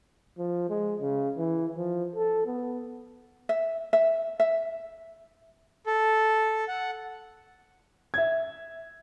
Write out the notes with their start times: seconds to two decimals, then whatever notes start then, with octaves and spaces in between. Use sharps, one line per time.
0.38 F3
0.69 G#3
1.00 C#3
1.38 E3
1.77 F3
2.16 A4
2.46 B3
3.49 E5
3.93 E5
4.40 E5
5.87 A4
6.68 F#5
8.14 E5 G#6